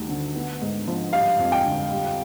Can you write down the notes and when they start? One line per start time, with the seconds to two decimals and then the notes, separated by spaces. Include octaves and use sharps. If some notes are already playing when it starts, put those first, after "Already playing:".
Already playing: D2 D#3 G3
0.09 D3
0.35 B3
0.62 G#2
0.88 F3
1.13 G3 F5
1.39 F2
1.52 G5
1.65 D3
1.91 G3